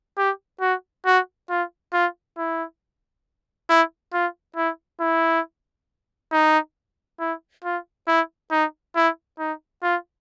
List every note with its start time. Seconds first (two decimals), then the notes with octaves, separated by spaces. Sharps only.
0.17 G4
0.61 F#4
1.06 F#4
1.50 F4
1.93 F4
2.38 E4
3.69 E4
4.13 F4
4.57 E4
5.01 E4
6.32 D#4
7.20 E4
7.65 F4
8.08 E4
8.52 D#4
8.96 E4
9.39 D#4
9.83 F4